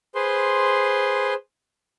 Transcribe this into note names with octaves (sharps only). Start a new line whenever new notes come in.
G#4 B4 C5 C6